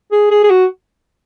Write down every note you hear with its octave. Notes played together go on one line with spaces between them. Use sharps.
G#4
G#4
G#4
F#4